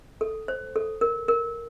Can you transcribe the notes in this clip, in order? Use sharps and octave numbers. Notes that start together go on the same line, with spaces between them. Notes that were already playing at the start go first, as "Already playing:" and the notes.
A4
C5
A4
A#4
A#4